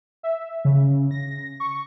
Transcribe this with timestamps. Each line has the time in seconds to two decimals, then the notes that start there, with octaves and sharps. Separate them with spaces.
0.23 E5
0.65 C#3
1.11 A#6
1.60 C#6